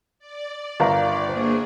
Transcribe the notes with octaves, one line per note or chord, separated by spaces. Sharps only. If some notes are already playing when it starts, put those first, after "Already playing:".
D5
G1 A#4 F5 A#5
A#3 D4 G#4 C5